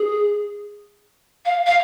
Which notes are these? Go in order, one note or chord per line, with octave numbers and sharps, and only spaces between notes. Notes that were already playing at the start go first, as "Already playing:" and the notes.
Already playing: G#4
F5
F5